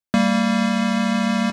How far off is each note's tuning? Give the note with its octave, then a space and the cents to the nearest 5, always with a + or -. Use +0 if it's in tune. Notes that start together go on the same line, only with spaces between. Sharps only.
G3 +0 A#3 -25